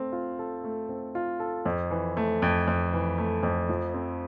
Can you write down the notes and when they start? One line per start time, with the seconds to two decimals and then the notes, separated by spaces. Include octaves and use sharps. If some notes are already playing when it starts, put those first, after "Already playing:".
Already playing: A3 C4
0.12 F4
0.39 A4
0.64 A3
0.89 C4
1.15 F4
1.40 A4
1.66 F2
1.91 E3
2.17 A3
2.42 F2
2.68 F2
2.93 E3
3.18 A3
3.43 F2
3.69 F3
3.94 C4